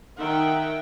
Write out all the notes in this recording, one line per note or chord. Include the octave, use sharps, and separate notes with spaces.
D#3 D#4 E5 F#5 G5